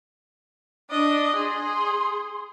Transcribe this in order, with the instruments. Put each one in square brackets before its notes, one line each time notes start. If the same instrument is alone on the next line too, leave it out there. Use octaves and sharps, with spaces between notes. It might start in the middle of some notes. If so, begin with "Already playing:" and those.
[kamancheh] D4 D#5
[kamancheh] G#4 [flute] C6